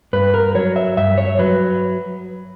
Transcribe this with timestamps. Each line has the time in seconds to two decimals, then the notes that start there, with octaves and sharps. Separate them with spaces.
0.13 G2 B4
0.34 A#4
0.55 F#3 C#5
0.76 E5
0.97 G2 E5
1.18 C#5
1.39 F#3 B4